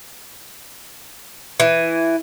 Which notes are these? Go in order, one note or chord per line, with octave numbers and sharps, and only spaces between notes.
E3